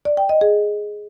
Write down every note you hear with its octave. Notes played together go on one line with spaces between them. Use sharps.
D5
G5
D#5
G#4